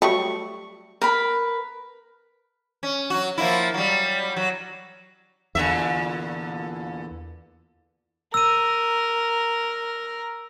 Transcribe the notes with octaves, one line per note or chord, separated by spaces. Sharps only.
F#3 G3 A3 C#6
A#4 B4 B5
C#4
F#3 F#4
F3 A#3 E4
F#3 G3
F#3
E2 A#2 D3 E5
A#4 E6 D#7